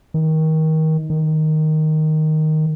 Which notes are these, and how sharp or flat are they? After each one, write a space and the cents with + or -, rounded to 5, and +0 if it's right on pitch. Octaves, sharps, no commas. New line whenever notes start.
D#3 +25
D#3 +0